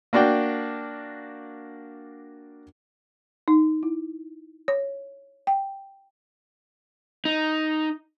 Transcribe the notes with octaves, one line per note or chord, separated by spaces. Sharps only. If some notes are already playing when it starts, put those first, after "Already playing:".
A#3 D4 F#4 D5 G5
D#4
E4
C#5
G5
D#4